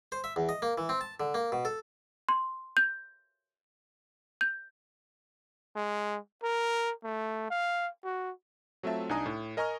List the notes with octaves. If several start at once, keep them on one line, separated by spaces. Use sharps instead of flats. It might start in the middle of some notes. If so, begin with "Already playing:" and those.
C5
E5
E2
D#5
A#3
E3
C4
A5
D3
A#3
B2
A4
C6
G6
G6
G#3
A#4
A3
F5
F#4
F#3 A3 C4 F4 E5 A5
C2 D4 D#4 G#5 A#5 D#6
A2
A#4 D#5 G#5 A#5 C#6 F6